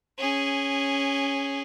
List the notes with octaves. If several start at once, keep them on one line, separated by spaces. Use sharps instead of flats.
C#4 G#4